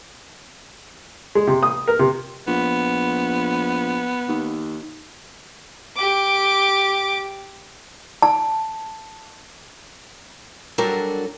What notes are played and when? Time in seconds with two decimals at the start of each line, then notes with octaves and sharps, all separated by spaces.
1.35 G#3
1.47 C3
1.63 D#6
1.88 A#4
1.99 C3
2.47 A#1 B3
4.28 D#2
5.96 G4 D6
8.22 A5
10.78 F#3 G3 D4 F#4 A4 A#4